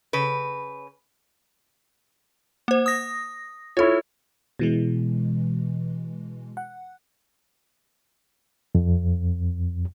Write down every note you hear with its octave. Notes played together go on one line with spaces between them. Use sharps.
C#3 B4
A#3 C5
D#6 A#6
E4 F4 A4 C#5
B2 E3 G#3
F#5
F2